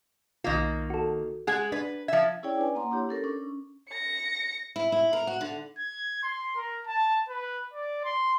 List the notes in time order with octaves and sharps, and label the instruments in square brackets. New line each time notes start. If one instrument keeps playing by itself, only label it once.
[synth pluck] B1 F4 [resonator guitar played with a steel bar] D#3 A#3
[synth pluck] F#4 A4
[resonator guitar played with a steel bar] G#3 G#4 [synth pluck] F#5 G#6
[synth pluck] D4 [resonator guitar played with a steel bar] B4
[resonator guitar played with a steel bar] F3 E5 [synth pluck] G#6
[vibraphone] C#4 E4 G#4 C#5 D5 G5
D4 B4 G#5
A#3 F#5 A#5 C6
D4 E4 G4 C#5
C#4 A4 A#4
C#4 D4
[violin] A#6 C#7
[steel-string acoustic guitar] E4
E4
A#4
F#4
D3
[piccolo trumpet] G#6
C6
A#4
A5
B4
D5
C6